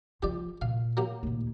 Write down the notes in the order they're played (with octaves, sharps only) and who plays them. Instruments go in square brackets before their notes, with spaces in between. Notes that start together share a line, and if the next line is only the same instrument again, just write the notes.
[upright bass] F3 F4 [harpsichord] G4 D5
[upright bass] A#2 [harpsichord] F5
[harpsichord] F#3 A#3 G4
[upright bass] D#2 A#2